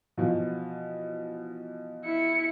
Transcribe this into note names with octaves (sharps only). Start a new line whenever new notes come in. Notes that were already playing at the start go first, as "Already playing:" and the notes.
B2 E3 F3
E4 C#7